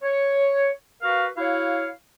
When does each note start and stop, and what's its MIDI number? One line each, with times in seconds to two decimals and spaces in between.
0.03 0.70 73
1.03 1.27 66
1.03 1.27 70
1.03 1.27 71
1.03 1.27 77
1.37 1.90 64
1.37 1.90 66
1.37 1.90 73
1.37 1.90 77